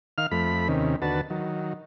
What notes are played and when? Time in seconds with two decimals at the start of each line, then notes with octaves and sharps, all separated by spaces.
0.18 D#3 F5 F6
0.31 F2 A3 B5
0.68 D#2 C3 D#3 C#4
1.02 D#2 D3 F#4 B4 A5
1.30 D#3 F#3